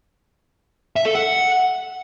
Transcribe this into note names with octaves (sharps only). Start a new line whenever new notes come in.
E5
A4
F#5